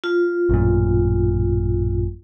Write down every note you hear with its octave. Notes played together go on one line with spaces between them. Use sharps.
F4
A1 F#2 A#2